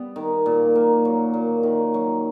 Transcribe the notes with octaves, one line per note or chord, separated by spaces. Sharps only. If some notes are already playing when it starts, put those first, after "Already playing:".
Already playing: G3 B3
D#3
A#2
A#3
F#3
A#2
D#3
F#3